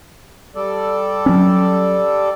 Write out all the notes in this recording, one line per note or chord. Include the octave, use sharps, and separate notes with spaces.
G3 A4 D5
F#3 C#4